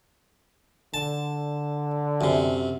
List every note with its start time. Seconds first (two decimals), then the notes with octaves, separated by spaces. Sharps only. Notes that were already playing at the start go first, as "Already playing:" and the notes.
0.94 D3 A5
2.21 F#2 C3